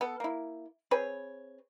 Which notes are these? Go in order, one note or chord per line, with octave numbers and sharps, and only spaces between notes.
B3 A4
A#3 E4
C4 G#4 B4 C#5